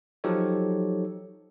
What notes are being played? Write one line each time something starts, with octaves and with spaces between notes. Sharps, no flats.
F3 F#3 D#4 G4 A4 C#5